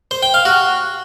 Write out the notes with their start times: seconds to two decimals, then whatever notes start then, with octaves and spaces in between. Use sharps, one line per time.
0.11 C5
0.23 G5
0.34 F5
0.45 F#4